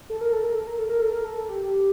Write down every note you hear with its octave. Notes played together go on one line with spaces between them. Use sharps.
A4
A#4
A4
A#4
A4
A#4
A4
A#4
A4
A#4
A4
G4